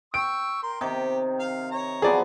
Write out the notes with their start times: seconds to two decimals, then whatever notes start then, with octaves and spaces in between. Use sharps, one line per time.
0.14 G5 C#6 E6 D7
0.63 A#4 C6
0.81 C3 D#3 G4
1.40 F5
1.71 C#5 A#5
2.02 F3 F#3 B3 G#4 D5